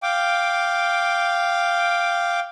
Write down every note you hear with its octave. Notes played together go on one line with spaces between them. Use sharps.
F5 G5 D6